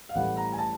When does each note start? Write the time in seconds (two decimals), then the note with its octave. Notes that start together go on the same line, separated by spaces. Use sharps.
0.09 F5
0.15 A1 A2 E3 G3 F#5
0.37 A#5
0.52 G#5
0.58 A5